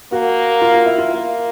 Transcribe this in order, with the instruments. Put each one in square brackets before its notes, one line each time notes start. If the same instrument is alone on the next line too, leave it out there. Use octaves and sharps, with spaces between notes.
[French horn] A#3 [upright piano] F#4
[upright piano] F4
F4
E4
F4
[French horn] A#3